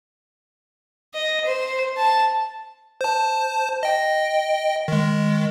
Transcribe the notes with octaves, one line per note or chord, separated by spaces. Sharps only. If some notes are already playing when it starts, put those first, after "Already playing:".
D#5
C5
A5
C5 A5
D#5 G5
D#3 G#3